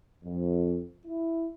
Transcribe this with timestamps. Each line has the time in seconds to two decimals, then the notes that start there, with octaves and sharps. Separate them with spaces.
0.24 F2
1.06 E4